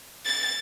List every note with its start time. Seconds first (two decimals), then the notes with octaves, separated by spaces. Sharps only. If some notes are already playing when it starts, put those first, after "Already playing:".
0.25 A6